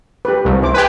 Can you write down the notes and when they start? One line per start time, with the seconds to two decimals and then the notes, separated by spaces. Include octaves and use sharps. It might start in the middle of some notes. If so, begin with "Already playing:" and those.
0.25 G4 B4
0.45 C2
0.62 E4 C5 D6
0.74 G4 B4 G#5 B5